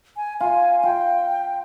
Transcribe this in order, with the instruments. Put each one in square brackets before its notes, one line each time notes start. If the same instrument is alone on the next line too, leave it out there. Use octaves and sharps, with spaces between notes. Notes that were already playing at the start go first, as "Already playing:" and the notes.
[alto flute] G#5
[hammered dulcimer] F4 [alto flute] G#5
[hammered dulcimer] F4 [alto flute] G5